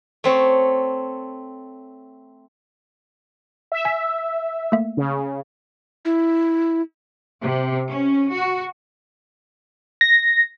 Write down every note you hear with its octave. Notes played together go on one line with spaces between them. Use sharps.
A3 C4 C#5
E5
G#5
A3 A#3 E5
C#3
E4
C3
C#4
F#4
A#6